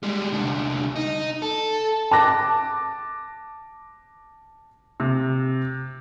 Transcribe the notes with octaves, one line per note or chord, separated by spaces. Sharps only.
G3 G#3
C2 D3
D#4
A4
A5 D6 F#6 A#6
C3